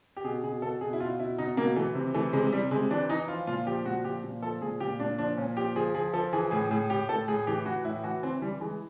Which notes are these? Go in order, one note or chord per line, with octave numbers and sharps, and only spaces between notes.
G4
B2 G#4
B2 G#4
B2 A4
B2 G#4
E4
B2 F4
B2 E4
B2 D#4
B2 A#3
E3 A3
C3
E3 A3
C3 G#3
C3 G3
C3 G#3
E3 D4
E3 D#4
F3 F4
A#2 F4
F3 G4
A#2 F#4
F3 G4
A#2
F3 A4
A#2 G#4
A#2 G4
A#2 D4
F3 D4
A#2 C#4
F3 G4
F3 G#4
F3 G#4
F3 A4
E3 G#4
A2 G#4
A2 G#4
A2 G4
A2 A4
A2 G#4
G#4
E3 G4
E3 F#4
A2 E4
E3 F#4
E3 C4
E3 G3
E3 G#3